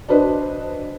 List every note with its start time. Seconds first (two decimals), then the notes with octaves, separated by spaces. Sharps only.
0.09 D4 F#4 B4 C5 D#5